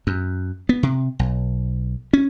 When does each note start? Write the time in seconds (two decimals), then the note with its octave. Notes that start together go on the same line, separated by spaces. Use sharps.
0.07 F#2
0.69 B3
0.83 C3
1.19 B1
2.13 C#4